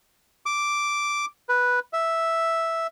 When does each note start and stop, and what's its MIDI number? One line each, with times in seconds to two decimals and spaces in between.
0.46 1.26 86
1.49 1.79 71
1.93 2.87 76